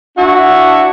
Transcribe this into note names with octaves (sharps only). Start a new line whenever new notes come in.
D4 E4 F#4